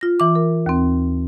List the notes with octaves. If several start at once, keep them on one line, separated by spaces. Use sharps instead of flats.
F4 A#6
E3 D6
A#4
D#2 C4